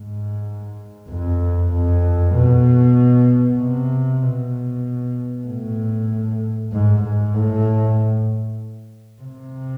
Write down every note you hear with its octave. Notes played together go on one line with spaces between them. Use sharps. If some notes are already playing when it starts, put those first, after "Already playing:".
Already playing: G#2
F2
F2
B2
C3
B2
A2
G#2
G#2
A2
C3